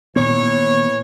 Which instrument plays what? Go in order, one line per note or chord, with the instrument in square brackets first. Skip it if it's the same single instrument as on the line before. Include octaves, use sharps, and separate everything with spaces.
[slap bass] A#2 D#3 B3 [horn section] E3 C#5